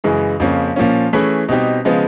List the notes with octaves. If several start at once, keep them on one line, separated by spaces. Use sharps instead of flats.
F#2 C#3 E3 G#3
F2 C#3 F3 A#3 C#4
A#2 F3 A#3 C#4
E3 A3 C#4 E4 G#4
B2 G3 C4 D#4 G4
C#3 F3 G#3 B3